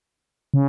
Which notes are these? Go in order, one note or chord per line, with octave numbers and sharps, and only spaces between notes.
C#3